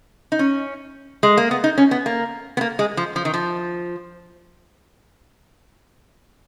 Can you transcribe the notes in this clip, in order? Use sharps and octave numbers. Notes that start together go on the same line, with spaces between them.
D#4
C#4
G#3
A#3
B3
D#4
C#4
B3
A#3
B3
A#3
G#3
F3
F3
D#3
F3